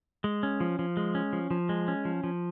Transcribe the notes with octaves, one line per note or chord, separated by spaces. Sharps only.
G#3
C#4
F3
F3
G#3
C#4
F3
F3
G#3
C#4
F3
F3